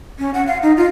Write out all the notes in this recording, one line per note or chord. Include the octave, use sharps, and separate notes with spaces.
C#4
F#5
F5
D#4
F4